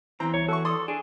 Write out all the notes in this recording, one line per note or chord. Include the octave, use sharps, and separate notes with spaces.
E2 E3 C4 A#5
C2 C#5
F#4 A4 E5 C#6
A4 D5 C6 D#6
D4 G#4